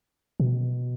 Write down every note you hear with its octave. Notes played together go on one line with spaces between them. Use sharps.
B2